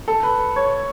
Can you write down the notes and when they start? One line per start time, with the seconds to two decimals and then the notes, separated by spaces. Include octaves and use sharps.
0.08 A4
0.23 B4
0.56 C#5